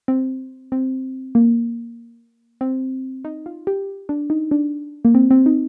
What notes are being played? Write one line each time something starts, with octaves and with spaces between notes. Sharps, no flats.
C4
C4
A#3
C4
D#4
F4
G4
D4
D#4
D4
A#3
C4
C4
D#4